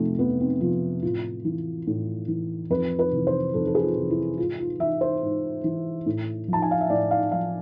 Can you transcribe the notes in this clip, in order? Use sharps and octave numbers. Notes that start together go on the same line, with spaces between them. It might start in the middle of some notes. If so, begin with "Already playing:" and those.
Already playing: F2 C3 F3 A3 C4
F2 B3
C4
C3 F3 F4
A2 F4
E3
A2
E3
F2 B4
B4
C3 E3
C5
F2 A4
A4
G#4
F4
C3 E3
E4
G#2 F4
F4
E3 E5
C5
G#2
E3
A2
F3
A5
G#5
F5
E5
A2 D5
F5
F3 F5